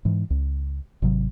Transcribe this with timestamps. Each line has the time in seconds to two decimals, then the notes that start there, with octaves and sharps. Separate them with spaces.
0.05 G#2 E3
0.30 C#2
1.02 G#1 C3 F#3